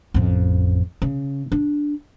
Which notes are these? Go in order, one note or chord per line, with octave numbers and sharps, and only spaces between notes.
A1 F2
C#3
D4